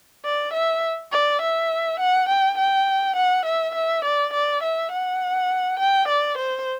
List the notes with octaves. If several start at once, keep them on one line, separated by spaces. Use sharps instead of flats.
D5
E5
D5
E5
F#5
G5
G5
F#5
E5
E5
D5
D5
E5
F#5
G5
D5
C5